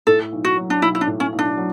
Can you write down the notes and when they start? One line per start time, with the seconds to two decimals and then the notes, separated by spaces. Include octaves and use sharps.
0.07 A2 A4
0.32 B1
0.44 F#4
0.57 F#3
0.70 D4
0.82 B1 E4
0.95 E4
1.01 D4
1.07 A2
1.20 C#4
1.32 B1
1.39 D4
1.57 F#3